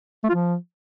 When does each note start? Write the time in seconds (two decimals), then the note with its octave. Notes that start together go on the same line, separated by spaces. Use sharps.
0.24 A3
0.29 F4
0.34 F3